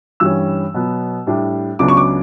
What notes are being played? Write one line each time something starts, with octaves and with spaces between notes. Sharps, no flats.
G2 E3 G3 C#4 E6
B2 F#3 B3
A2 G3 D4
C#2 C#3 F#3 B3 D4 D6
C#6
D6